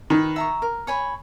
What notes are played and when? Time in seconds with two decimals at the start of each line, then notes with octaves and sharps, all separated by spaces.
0.10 D#3 B4
0.36 E5 A#5 C#6
0.62 A#4
0.87 C#5 G#5 B5